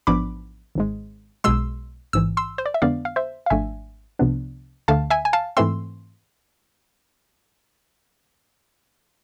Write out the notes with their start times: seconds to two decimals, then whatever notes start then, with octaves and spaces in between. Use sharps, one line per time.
0.07 A1 G#2 F3 B3 D4 B5 D6
0.75 G#1 G#2 G#3
1.44 B1 B2 G#3 C6 E6
2.13 A1 G#2 E3 E6
2.37 C6 E6
2.58 C5
2.66 D5
2.74 E5
2.82 F2 D3 G#3 B3 D4 D5 F5
3.05 F5
3.16 C5 E5
3.46 F5
3.50 G#1 G#2 F3 A3 D4 E5 G#5
4.19 C2 C3 F3 B3 D4
4.88 D2 D3 A3 F5 A5
5.10 E5 G#5
5.25 G#5
5.33 F5 A5
5.57 G#2 E3 A3 C4 C6 E6